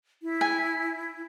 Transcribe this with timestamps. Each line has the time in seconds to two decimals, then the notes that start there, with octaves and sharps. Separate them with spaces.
0.22 E4
0.41 G#5